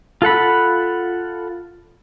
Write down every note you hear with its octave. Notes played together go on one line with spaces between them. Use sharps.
F4 A4 F#5 B5